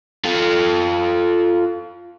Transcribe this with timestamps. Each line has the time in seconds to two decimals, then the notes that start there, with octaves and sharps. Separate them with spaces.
0.25 F4 A4